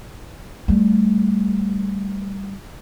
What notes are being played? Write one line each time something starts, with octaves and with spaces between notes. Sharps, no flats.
G3 A3